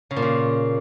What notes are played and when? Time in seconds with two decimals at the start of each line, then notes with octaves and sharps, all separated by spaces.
0.11 C#3
0.16 A#2
0.22 C#3